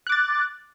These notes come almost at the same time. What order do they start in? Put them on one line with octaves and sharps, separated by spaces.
F#6 D6 A6